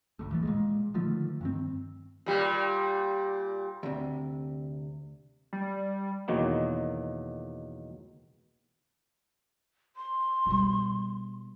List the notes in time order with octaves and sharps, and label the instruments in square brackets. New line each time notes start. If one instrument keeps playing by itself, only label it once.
[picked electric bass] G#1 D2 A2
A1 E3 A3
A#2 G#3
D3 D#3 F3 A3
G2 D#3 C4
[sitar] A#2 G3
[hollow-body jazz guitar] D2 C3
[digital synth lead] G3
[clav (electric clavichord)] E2 B2 D#3 F#3 A#3
[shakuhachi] C6
[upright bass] B2 G3